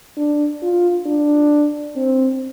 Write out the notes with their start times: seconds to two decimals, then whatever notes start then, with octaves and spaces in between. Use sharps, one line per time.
0.17 D4
0.63 F4
1.06 D4
1.96 C4